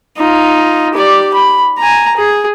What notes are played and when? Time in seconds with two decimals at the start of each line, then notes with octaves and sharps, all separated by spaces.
0.17 D#4 F4
0.94 G4 D5
1.34 B5
1.78 G#5 A#5
2.17 G#4